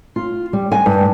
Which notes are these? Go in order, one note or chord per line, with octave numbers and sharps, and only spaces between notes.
F4
G3
G#5
G2